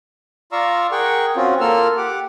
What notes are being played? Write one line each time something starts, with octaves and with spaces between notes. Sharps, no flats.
F4 D5 F5 A#5 C#6 E6
G#4 A#4 F#5 G5 C#6
C4 C#4 F4 F#4
A#3 F4 A4 A#4 E6 F6
G4 F#5 D6